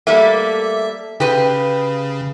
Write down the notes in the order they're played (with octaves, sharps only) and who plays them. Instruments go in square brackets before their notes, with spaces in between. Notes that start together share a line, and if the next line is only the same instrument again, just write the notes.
[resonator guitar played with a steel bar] G3 A3 A#3 [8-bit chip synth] E5
[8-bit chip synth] C#3 [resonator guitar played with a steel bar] G4 B4